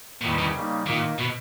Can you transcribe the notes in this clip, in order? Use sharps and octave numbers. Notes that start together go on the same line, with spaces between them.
E2 A#2 D#3 G3
C#3
C#3 G3 A#3 D#4
A#2 D#3 A#3 D#4
B2